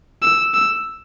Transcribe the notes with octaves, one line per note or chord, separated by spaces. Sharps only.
E6
E6